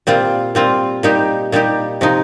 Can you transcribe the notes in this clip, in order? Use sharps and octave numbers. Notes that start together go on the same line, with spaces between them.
A#2 G3 C4 F4
A#2 G3 C4 F4
A#2 G3 D#4 G4
A#2 G3 D#4 G4
C3 F3 D#4